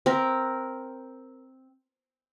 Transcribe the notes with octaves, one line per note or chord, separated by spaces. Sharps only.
C4 A#4